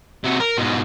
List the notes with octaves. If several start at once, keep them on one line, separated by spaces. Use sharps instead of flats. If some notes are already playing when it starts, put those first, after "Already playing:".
C3 F#4
A#4
G#2 B2